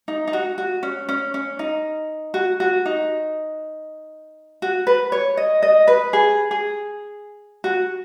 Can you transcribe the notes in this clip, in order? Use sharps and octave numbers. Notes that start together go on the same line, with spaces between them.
D#4
D#4
F#4
F#4
C#4
C#4
C#4
D#4
F#4
F#4
D#4
F#4
B4
C#5
D#5
D#5
B4
G#4
G#4
F#4